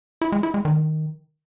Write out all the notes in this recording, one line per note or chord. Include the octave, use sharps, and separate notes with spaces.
E4
G#3
E4
G#3
D#3